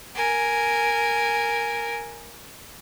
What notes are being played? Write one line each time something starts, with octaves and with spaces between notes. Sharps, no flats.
A#4 G#5